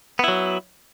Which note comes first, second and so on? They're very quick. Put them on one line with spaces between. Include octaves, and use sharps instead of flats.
B3 E4 F#3